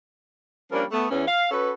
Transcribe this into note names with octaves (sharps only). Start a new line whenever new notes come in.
F3 G3 A#3 C#4 D4 A#4
A3 B3
E2 E3 C#4
F5
C#4 F#4 A4 B4